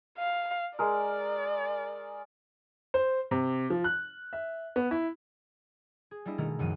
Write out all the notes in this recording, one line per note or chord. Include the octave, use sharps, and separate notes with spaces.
F5
G#3 A#4 D5
C5
C3
F3
F#6
E5
B3
E4
G#4
G3 A#3 D4 E4 D#5
B2 D#3 G#3 A3 A#4
C#2 F#2 D#3 F3 D#7